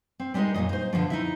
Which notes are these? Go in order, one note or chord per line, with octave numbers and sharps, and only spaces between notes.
C4
G3 G#3 B3 D#4 A#4 D#5
F#2 A#2 D#3 E3 D#5
D#4 C5
B2 D3 E3 F3 A3
D#4 E4 E5